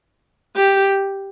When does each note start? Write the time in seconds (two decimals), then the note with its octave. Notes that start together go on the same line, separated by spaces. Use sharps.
0.56 G4